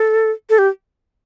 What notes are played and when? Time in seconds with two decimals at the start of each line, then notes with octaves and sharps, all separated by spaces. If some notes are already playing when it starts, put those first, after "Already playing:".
Already playing: A4
0.50 A4
0.58 G4